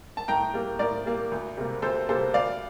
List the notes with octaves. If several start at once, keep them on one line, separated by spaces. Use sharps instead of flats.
A5
A2 G5 A#5
G3 A#3
A2 A#4 D5
G3 A#3
D2
C3 G3 A#3
D2 A4 C5
C3 G3 A#3 A4 C5
D2 D5 F5